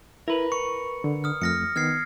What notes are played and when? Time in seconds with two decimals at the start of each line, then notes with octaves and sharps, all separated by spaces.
0.28 E4 A#4 B4
0.52 C#6 C#7
1.04 D3
1.24 D#6 F6
1.42 F2 A3 F6 A#6 C#7
1.76 D#3 B3 F6 G#6 C7